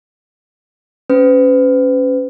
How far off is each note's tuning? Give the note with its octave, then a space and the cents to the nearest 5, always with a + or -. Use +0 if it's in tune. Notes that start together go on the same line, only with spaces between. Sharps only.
C#4 +0 B4 +40